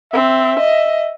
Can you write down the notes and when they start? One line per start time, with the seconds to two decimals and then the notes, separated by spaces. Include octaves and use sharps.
0.13 C4 E5
0.60 D#5